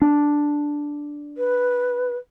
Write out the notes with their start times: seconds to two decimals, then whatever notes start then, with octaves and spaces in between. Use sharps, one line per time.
0.02 D4
1.37 B4